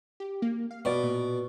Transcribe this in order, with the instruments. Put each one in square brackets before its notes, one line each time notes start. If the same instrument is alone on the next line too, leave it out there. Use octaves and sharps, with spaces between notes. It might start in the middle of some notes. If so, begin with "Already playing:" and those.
[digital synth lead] G4
A#3
F5
[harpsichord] B2 [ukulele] B4 D5
[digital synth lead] A#2